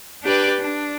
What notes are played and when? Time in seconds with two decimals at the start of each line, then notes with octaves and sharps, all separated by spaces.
0.23 D4 G4 B4 D5
0.59 D4